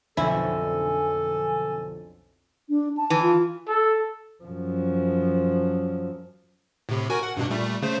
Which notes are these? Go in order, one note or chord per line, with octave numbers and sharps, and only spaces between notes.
B1 F2 D3 E4 A4 G#5
D4
A5
E3
F4
A4
F#2 F3
A2 C3
F#4 A#4 G#5
F#5
G2 B2 D4
A#2 G3 A3
C#3 A3 C5